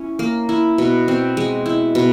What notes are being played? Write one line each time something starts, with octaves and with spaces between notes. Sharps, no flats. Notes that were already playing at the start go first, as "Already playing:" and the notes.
Already playing: C#4 E4
A#3
E4
B2
C4
G#3
E4
B2